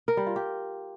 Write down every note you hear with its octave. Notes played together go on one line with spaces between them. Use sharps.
A#4
G3
F4
G4